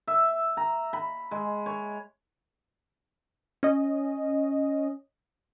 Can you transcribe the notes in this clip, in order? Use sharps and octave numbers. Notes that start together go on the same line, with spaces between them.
E5
A#5
B5
G#3
C#5
C#4 D#5